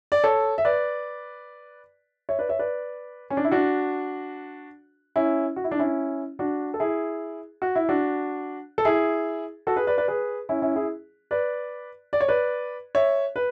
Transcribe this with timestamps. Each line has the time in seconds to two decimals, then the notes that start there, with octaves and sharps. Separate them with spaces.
0.12 D5
0.24 A4 C#5
0.58 E5
0.65 B4 D5
2.29 C#5 E5
2.39 B4 D5
2.49 C#5 E5
2.59 B4 D5
3.30 C#4
3.37 D4
3.44 E4
3.51 D4 F#4
5.16 C#4 E4
5.56 F#4
5.64 E4
5.71 D4
5.79 C#4 E4
6.39 D4 F#4
6.74 A4
6.80 E4 G#4
7.62 F#4
7.75 E4
7.89 D4 F#4
8.78 A4
8.85 E4 G#4
9.67 F#4 A4
9.76 G#4 B4
9.87 B4 D5
9.98 B4 D5
10.08 G#4 B4
10.49 C#4 E4
10.62 C#4 E4
10.76 E4 G#4
11.31 B4 D5
12.13 D5
12.21 C#5
12.28 B4 D5
12.95 C#5 E5
13.36 B4